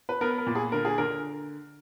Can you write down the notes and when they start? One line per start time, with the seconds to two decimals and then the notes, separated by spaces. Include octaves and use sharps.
0.09 B4
0.21 B3 A#4
0.38 A#4
0.47 A#2
0.55 G#4
0.72 D3 A#4
0.85 G#4
0.98 D3 A#4